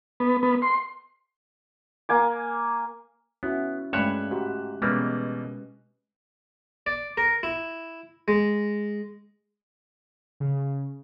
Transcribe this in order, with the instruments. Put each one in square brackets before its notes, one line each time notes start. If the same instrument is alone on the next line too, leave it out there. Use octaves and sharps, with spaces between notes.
[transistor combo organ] B3
B3
C6
[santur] A#3 G#5 D6
[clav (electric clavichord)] B3 [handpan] C#4 E4 F#4
[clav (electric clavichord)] G2 C#5 [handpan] G#3 A3 C#4 [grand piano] B5 F#6 E7
[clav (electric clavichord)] G#2 [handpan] F#4 G4
[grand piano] B2 [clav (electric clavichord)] E3 G3 A#3 [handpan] G#3 C#4 B4
[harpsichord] D5
A#4
E4
G#3
[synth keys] C#3